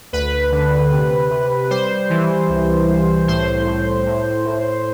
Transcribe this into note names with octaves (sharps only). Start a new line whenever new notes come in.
D2 B4
D3
C3
C3
G3 C5
E3
C2
C2
A2 C5
A2
A2
A2